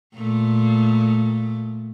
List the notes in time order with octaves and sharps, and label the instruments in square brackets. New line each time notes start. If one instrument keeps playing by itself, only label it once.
[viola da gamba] A#2 A3